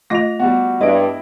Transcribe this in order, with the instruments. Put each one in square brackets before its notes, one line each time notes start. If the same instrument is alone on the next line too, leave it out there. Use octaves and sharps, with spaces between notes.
[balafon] A3 F4 D#5 [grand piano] A#6 F7
[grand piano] G3 F#4 [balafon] B3
[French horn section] G2 [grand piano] E4 D7 [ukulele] D#5